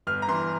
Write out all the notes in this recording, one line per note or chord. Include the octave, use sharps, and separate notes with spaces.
G1 F6
A#5
E3 C6